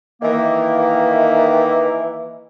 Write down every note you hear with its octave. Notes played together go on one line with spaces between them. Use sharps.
D#3 E3 A#3